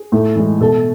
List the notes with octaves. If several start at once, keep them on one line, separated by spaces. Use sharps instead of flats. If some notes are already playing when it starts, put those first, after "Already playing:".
Already playing: G#4
A2
E3 G#3
B2 A4